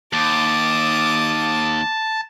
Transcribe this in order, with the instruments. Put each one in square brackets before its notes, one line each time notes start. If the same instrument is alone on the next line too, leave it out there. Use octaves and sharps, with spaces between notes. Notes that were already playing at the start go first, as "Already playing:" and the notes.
[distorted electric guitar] D#2 [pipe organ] A5 [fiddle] D6 D#6